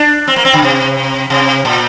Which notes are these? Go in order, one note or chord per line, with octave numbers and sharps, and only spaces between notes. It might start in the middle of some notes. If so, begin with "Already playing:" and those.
Already playing: D4
C4
A#3
C4
D3
C3
C3
A#2